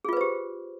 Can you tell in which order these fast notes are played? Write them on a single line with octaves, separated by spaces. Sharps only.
G#4 F4 B4 C5 G4